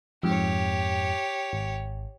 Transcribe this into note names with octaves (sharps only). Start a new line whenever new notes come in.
F2 G#2 G4 C#5
G#1